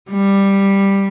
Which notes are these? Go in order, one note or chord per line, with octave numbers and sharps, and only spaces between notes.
G3